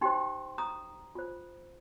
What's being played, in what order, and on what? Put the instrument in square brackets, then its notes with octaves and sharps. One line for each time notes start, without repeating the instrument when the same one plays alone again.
[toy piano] D#4 G4 C5 G5 C6
A#5 D#6
F4 C5